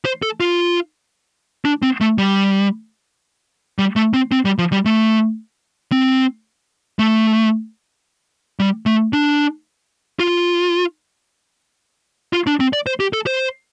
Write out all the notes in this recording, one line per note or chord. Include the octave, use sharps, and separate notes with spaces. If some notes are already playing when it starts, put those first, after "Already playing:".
C5
A4
F4
D4
C4
A3
G3
G3
A3
C4
C4
G3
F3
G3
A3
C4
A3
G3
A3
D4
F4
F4
D4
C4
D5
C5
G4
A4
C5